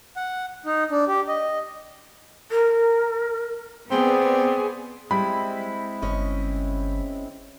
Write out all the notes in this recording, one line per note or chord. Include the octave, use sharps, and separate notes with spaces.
F#5
D#4
D4
G4
D#5
A#4
B3 C4 G#4 D5
G3 G#3 C4 E4 B5
G1 C#4 D#5